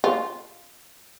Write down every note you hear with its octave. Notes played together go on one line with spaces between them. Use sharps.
F4